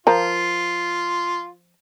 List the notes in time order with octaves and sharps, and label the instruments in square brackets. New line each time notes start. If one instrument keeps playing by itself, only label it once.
[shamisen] F3 A#4 [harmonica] F4